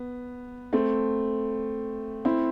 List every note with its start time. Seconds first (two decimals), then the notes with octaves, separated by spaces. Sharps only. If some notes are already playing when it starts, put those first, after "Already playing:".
Already playing: B3
0.73 A3 C4
2.25 C4 E4